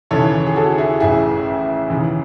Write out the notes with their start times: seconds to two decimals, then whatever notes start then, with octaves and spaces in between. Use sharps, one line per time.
0.11 D#2 C#3 E3 A4 C#5
0.47 G#4
0.56 F#4 A4
0.78 E4 G#4
1.00 A1 A2 E3 E4 G#4
1.90 D#2 C#3 E3